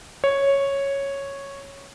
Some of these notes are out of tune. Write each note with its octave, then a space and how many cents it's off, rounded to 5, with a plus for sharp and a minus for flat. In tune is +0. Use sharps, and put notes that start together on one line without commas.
C#5 -5